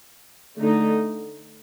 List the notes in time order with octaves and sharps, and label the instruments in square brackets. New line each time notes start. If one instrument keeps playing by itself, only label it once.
[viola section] D3 A3 D#4